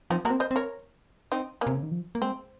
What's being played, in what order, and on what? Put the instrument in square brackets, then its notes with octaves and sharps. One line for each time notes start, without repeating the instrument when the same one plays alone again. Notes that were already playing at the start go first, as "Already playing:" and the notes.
[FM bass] F3 [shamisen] C4 D#4
[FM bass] A#3 [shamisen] F#4 A#4
[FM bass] C4
[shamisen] C5 D#5
[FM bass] C4
[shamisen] A#4 C#5
C4 D#4
A#3 C#4
[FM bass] C3
C#3
D#3
F3
A#3
[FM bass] G#3 [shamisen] C4